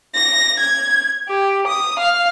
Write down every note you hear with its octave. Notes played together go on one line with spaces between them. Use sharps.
A#6
G#6
G4
D#6
F5